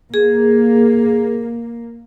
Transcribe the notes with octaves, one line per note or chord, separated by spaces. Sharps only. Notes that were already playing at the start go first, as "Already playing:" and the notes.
A#3 G#4